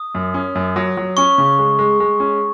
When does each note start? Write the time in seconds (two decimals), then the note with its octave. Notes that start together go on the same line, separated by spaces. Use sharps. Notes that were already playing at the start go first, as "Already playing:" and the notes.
Already playing: D#6
0.15 F#2
0.34 C#4
0.55 F#2
0.76 F#3
0.97 F#3
1.17 C#4 C#6
1.38 C#3
1.58 G#3
1.79 G#3
2.00 G#3
2.20 C#4